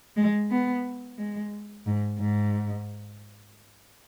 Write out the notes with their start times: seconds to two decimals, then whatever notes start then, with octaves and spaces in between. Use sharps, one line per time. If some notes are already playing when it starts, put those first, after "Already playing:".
0.17 G#3
0.50 B3
1.18 G#3
1.86 G#2
2.19 G#2